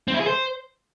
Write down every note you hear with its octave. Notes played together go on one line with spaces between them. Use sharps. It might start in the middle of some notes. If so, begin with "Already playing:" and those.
C4
E4
G#4
C5